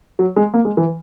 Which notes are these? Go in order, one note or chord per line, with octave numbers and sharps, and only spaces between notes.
F#3
G#3
A#3
G#3
E3